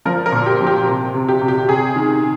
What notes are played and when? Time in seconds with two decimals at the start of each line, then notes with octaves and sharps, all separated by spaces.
0.05 F3 A#4
0.26 A#4
0.32 A#2
0.46 G4
0.60 F3
0.67 G4
0.87 C3
1.14 C3
1.29 G4
1.41 C3
1.48 G4
1.68 C3 G#4
1.96 D#3